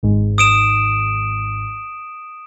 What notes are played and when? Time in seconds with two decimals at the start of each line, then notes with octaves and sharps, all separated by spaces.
0.03 G#1 G#2
0.38 D#6 D7 E7